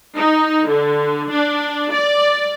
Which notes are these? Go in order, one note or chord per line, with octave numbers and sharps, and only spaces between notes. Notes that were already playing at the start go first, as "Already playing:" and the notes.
D#4
D3
D4
D5